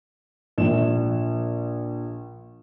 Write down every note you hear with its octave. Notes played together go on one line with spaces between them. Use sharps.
A#1 E7